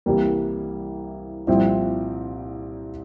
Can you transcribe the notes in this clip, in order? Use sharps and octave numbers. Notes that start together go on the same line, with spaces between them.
C2 C3 E3 G3 A#3
C2 A#2 F3 C4 E4